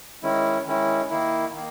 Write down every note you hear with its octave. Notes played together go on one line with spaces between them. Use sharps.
D#3 G#3 C#4 E4
D#3 G#3 C#4 E4
D#3 A#3 E4
D#3 A#3